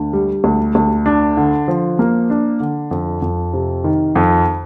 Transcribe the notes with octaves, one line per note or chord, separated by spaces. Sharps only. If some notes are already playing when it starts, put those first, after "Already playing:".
Already playing: D2 D3
G3
D2
D2
D4
D3
F3
A#3
D4
D3
F2
F2
C3
D#3
F2